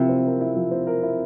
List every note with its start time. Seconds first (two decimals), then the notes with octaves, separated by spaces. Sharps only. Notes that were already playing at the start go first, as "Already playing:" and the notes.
Already playing: C3 F3 E4 A#4
0.09 C4
0.25 A#4
0.41 E4
0.55 F3
0.71 C4
0.87 A#4
1.03 E4